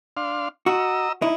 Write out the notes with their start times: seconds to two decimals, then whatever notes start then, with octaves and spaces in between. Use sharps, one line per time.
0.17 D4 F5 C6
0.66 F#4 D#5 A#5 E6
1.22 D#4 E4